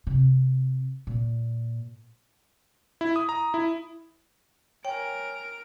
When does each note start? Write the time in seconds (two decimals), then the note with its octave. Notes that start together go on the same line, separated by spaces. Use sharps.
0.07 C3
1.07 A#2
3.01 E4
3.16 D#6
3.29 A#5
3.54 E4
4.85 A#4 C#5 G5 G#5 D7